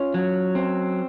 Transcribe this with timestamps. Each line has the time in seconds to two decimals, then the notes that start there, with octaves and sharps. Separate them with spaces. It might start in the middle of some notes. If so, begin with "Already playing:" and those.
Already playing: C#4 F4
0.14 F#3
0.55 C4